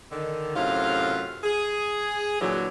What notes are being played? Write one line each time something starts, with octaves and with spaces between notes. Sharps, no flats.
D3 D#3
F#2 A2 C3 F4 F5
G#4
A#2 D3 E3 F#3